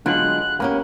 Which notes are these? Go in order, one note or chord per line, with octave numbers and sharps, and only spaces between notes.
D3 F#3 G#3 B3 F4 F#6
A#3 B3 C#4 G4